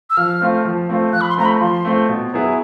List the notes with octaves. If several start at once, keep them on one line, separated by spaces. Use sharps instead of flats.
E6
F3 F6
A3 C4 F4
F3
A3 C4 F4
F3 F#6
B5
C6
A3 C4 F4 A#5
B5
F3 C6
A3 C4 F4
B2
F#3 B3 E4 G#4